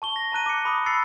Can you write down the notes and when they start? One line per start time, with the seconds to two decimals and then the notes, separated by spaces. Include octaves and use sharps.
0.02 A5 C#6 G7
0.16 A#6
0.32 A5 A#5 F#6 D#7
0.46 D6 C#7
0.65 B5 D6 D#6
0.86 B5 E6 A6 C7 C#7